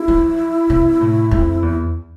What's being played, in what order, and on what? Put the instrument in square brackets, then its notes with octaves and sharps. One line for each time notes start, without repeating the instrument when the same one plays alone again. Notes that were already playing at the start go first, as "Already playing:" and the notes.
Already playing: [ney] E4
[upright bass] F3
C3
A2
F2
E2